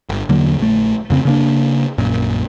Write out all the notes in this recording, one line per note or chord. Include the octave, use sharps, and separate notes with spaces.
G1
E2 D3 F#3 A#3
A#1 A3
F2 C#3 C4
C#3 A#3 D4
A#1 F#2 A#2